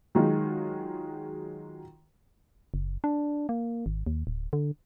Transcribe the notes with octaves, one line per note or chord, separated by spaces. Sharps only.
D#3 F#3 G#3 D#4 F4
F#1
D4
A#3
G#1
D#2
D1
D3